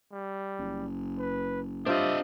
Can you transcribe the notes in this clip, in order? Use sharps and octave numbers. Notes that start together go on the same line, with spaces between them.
G3
F#1
B4
G2 C4 D4 F4 G4 D#5 E5